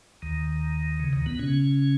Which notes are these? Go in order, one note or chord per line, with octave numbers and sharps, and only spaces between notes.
D#2 D#3
C#3
D#2 D#3
B2 B3
C#3 C#4